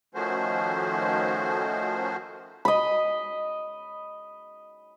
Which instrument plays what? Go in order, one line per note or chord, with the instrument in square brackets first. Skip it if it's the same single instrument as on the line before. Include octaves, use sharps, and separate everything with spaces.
[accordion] D#3 F3 A3 C#4 F#4 C5
[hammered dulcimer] D#5 B5